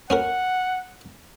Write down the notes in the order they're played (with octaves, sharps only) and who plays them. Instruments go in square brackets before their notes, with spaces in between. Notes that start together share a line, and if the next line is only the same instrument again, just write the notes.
[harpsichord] C#4 F#4 A#4 [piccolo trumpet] F#5